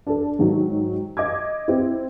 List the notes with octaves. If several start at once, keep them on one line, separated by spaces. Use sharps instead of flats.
D4 A4
G#2 D#3 F#3
D#5 D6 G#6
C4 E4